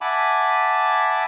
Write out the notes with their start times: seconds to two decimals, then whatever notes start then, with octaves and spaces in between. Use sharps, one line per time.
0.01 E5 F#5 G#5 A5 B5 D6